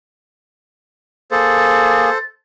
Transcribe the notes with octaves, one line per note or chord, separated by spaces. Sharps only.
A#3 G#4 A4 C5 A6